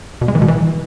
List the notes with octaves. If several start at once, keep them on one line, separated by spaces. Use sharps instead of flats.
B2
G#3
E3
B2
E3